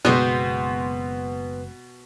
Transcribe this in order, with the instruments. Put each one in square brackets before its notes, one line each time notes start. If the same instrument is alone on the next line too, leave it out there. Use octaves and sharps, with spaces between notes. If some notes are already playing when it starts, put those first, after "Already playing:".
[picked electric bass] F#1 G#3 [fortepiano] B2 [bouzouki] B3 C4 C5